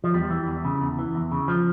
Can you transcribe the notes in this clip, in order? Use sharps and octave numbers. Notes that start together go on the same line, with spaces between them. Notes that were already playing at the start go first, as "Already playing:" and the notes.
F3
E2 G3
E3
E2
C#3
E2
E3
E2
C#3
F3